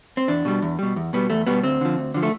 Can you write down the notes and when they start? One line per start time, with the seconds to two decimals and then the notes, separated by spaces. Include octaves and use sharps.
0.17 C4
0.28 E2 D4
0.45 B2 G3
0.62 E2
0.79 B2 G3
0.96 E2
1.13 B2 G3 B3
1.30 E2 A3
1.47 B2 G3 B3
1.63 D2 C4
1.81 D3 F3
1.98 D2
2.14 D3 F3
2.23 A3